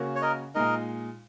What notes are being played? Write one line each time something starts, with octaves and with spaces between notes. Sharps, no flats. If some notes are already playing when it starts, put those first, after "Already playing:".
Already playing: C#3 A#3 C#4 F#4
C#5
A#4 D#5
A#2 G#3 D#4 A#4 D#5